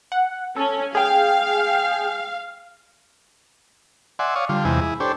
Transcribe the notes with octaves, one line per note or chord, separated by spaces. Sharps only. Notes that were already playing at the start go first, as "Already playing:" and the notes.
F#5
C#4 A4
G#4 F5 G5
D5 E5 F#5 G#5 C6
C#5 D5 F5 C#6 D#6
D3 G3 F4
E2 C3 G#3 E4 G#5
E4 G#4
D4 G4 A4 C5 C#5